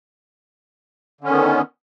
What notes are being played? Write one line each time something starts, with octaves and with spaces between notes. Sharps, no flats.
D3 D#3 B3 C#4